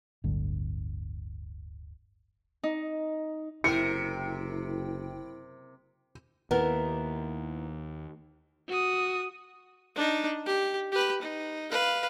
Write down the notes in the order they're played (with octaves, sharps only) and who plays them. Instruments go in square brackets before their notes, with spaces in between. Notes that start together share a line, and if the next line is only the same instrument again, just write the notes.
[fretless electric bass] D1 G1 D3
[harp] D#4
[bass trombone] F#1 [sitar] C3 A#4 [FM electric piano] E4 G5 [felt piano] C#7
[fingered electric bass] D#2 [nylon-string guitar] B3 E4 A#4
[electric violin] F#4 D#6
[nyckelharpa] D4 D#4
G4
G4 B4
D#4
B4 F5